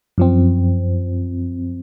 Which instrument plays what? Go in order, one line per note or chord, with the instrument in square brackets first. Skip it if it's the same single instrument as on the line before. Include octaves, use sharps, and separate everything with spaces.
[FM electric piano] F#2 F3 C4